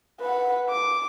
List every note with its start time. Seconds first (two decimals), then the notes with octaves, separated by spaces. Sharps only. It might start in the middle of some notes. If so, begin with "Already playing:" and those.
0.21 B4 F#5
0.70 D6